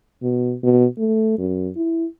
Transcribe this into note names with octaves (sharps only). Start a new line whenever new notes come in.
B2
B2
A3
F#2
E4